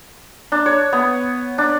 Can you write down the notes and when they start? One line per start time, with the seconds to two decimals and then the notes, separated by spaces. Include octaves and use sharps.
0.52 D4
0.66 C#5
0.93 B3
1.58 D4